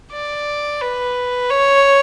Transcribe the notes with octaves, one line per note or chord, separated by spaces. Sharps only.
D5
B4
C#5